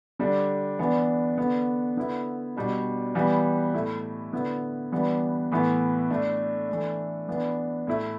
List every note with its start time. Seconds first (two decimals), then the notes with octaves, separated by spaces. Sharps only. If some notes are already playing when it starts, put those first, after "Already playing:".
0.19 D3 G3 D4
0.79 E3 B3 D4
1.37 D3 B3 D4
1.97 D3 B3 E4
2.56 B2 G3 D4
3.15 E3 G3 B3
3.73 A2 A3 E4
4.33 D3 B3 E4
4.92 E3 G3 B3 D4
5.52 A2 E3 B3 E4
6.10 A2 A3 D4
6.69 E3 A3 D4
7.29 E3 B3 D4
7.87 A2 A3 E4